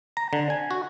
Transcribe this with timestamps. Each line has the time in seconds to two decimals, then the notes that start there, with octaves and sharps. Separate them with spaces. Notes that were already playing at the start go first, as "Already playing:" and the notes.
0.17 A#5
0.33 D3
0.50 G#5
0.71 F#4